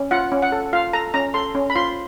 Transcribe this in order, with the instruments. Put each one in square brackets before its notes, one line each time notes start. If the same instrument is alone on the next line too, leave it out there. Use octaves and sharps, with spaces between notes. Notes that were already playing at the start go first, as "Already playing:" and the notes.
Already playing: [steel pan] C#4
F4 F#5
C#4
F#5
A4
F4 F5
A4 A#5
C#4 A#5
A4 C6
C#4
B5
F4 C6